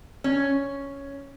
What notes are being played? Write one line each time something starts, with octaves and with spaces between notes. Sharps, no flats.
C#4